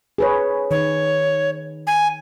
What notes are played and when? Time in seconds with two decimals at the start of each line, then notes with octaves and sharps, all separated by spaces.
0.18 G#4 B4 C#5
0.71 D#3 C#5
1.87 G#5